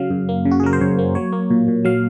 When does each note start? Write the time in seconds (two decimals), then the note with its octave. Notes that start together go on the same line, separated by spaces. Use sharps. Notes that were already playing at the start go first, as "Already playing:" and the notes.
Already playing: C#3 F#3 F5
0.10 F#2
0.29 A#3
0.45 C#3
0.51 F#4
0.60 G#4
0.63 F#3 A#4
0.73 C5
0.81 F#2 C#5
0.99 A#3
1.15 F#3 C#5
1.33 A#3
1.51 A#2
1.68 A#2
1.85 F#3 F5